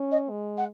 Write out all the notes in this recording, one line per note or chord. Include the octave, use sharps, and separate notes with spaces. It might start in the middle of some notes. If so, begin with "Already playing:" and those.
Already playing: C#4
D#5
G#3
F#5